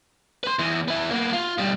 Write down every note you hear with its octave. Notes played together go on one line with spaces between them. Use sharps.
B4 C6
E2 E3
B3 E4
A#3 B3
F4
B2 G3